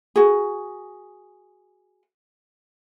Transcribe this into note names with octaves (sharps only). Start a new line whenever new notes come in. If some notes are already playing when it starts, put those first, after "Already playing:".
F#4 G#4